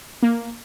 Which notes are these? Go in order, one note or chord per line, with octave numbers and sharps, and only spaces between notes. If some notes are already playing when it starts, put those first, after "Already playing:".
A#3